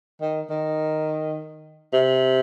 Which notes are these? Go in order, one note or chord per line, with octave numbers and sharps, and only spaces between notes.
D#3
D#3
C3